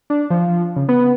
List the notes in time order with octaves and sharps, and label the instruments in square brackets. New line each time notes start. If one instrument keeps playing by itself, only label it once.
[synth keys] D4
F3
C#3
B3